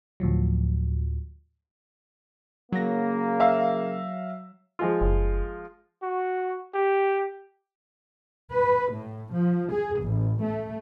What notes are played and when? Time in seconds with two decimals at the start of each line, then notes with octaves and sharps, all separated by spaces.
0.20 D2 A2 F3 F#3
2.72 C#3 F#3 A#3 A#6
3.40 E5 F5 E6
4.79 F3 G#3 F4
5.01 F#1
6.03 F#4
6.74 G4
8.52 B4
8.92 A2
9.34 F3
9.72 G#4
10.02 A1
10.42 A3